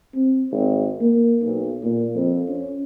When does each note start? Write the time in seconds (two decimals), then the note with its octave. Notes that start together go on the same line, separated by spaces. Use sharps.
0.14 C4
0.52 G#1
1.01 A#3
1.42 B1
1.84 A#2
2.15 F2
2.49 C#4